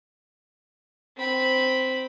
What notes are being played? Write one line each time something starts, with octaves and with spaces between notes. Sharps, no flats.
C4 B5